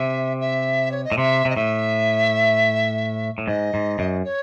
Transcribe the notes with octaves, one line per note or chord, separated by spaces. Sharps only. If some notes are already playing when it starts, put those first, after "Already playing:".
Already playing: C3 E5
E5
C#5
D#5
A2
C3 E5
C3 D#5
A2 E5
A2
G#2 D#5
G#2
F#2
C#5